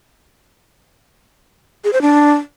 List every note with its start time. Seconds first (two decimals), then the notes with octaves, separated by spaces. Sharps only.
1.84 G#4
1.93 C5
2.02 D4